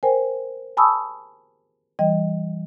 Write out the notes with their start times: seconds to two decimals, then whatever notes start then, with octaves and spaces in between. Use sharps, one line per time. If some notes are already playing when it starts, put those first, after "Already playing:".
0.03 A#4 C5 G5 G#5
0.77 G#5 A5 B5 C#6 D#6 E6
1.99 E3 G3 D#5 G5